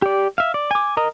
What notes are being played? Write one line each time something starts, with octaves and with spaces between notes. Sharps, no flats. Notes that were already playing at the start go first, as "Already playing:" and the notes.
G4 D5
E5 F5
D5
G#5 D6
A#4 D#5 A#5 D#6